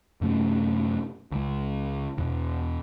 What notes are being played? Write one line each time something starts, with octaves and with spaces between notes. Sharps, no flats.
F#2 C3 A3 C#4
C#2 G#3
E2 B2